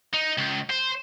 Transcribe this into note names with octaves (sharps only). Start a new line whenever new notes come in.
D#4
C#2
C5